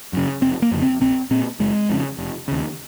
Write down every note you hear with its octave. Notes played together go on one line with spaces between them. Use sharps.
F#2 C#3
F1 C4
A#3
F2 C#3
C4
A#1 C4
A#2 C4
F#1 G#3
F2 C#3
F1
D#2 C#3